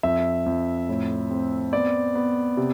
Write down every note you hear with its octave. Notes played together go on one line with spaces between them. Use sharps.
F2 E5
F2
A2
C4
B3 D5
B3
C3